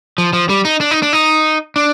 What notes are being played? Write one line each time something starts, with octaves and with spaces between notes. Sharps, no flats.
F3
F3
G3
D#4
D4
D#4
D4
D#4
D4